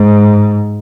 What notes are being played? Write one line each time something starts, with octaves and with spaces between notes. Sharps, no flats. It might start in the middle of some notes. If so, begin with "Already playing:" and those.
Already playing: G#2